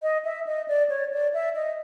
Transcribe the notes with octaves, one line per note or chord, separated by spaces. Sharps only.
D#5
E5
D#5
D5
C#5
D5
E5
D#5